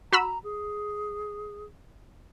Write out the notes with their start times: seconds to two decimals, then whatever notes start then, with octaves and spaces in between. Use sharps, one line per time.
0.13 F#4 A#5 B5 E6
0.44 G#4